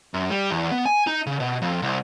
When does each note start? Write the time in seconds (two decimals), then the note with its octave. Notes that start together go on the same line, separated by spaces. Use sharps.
0.14 F#2
0.31 G3
0.51 E2
0.71 B3
0.86 G#5
1.07 D#4
1.26 C#3
1.40 B2
1.62 F2
1.82 C2